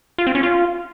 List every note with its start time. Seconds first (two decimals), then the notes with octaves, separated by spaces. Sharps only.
0.18 F4
0.27 C4
0.35 C#4
0.43 F4